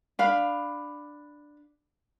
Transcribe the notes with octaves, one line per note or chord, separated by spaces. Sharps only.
D4 F5 B5